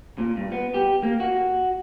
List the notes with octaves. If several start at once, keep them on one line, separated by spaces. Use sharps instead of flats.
A#2
G2
B3
G4
A#3
F#4